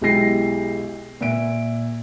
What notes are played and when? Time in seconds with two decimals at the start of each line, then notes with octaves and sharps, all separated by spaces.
0.01 B1 G#3 E4 G4 A#6 C7
1.21 A#2 E5 D7